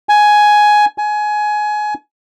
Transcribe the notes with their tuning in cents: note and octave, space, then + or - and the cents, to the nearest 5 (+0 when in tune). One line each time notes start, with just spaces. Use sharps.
G#5 +10
G#5 +20